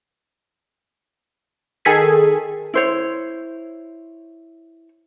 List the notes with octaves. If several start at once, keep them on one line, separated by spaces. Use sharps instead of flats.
D#3 G#4 A4 G#6 B6 D#7
E4 C5 C#5